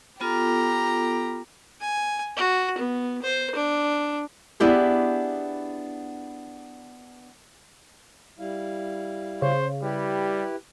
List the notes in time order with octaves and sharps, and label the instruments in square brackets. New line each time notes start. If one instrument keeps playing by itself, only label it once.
[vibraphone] B3 F4 A4 [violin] G4 A#5
[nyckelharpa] G#5
F#4
B3
C5
D4
[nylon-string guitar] B3 D4 E4 G4 G#4
[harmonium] G3 E4 F5
[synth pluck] C#3 [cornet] C5
[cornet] G3 [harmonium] E4 G4 B4